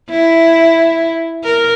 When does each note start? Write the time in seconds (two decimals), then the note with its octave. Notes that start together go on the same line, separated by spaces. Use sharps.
0.10 E4
1.44 A#4